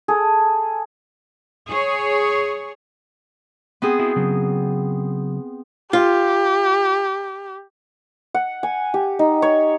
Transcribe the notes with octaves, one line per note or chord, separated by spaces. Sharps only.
G#4 A4
G#4 C#5
B3 C4 G#4
E4 F#4
C#3 F#3
F4 G4
F#5
G#5
G4
D#4
C#5